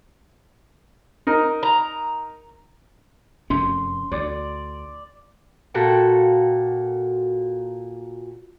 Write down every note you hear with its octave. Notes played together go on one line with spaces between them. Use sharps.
D#4 A#4
A#5
F1 F#2 C#4 C6
D2 D5
A#2 F#4 A4 G5